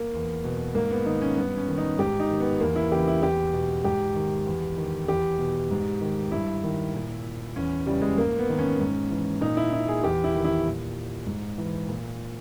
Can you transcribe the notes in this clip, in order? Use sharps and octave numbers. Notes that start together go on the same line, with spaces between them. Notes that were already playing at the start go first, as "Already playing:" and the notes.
Already playing: A#3
E2
B2
G#2 A#3
B3
D#3 D#4
C#4
G2 B3
C#4
D#3
D#4
G#2 G4
D#4
D#3
B3
E2 A#3
E4
C#3 E3 G4
E4
E2 G4
B2
G#2 G4
D#3
E2
D#3
E2 G4
B2
G#2
D#3
G2 E4
D#3
A#2
E2 C#4
C#3 E3 G3
G#3
G#2 A#3
B3
D#3
C#4
G#2
E3
A#2 D#4
E4
E4
G#4
E2 G4
E4
D#3
E4
A#2
G#2
E3
A#2